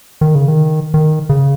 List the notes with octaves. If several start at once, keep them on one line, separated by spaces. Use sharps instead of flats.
D#3
C#3
D#3
D#3
C#3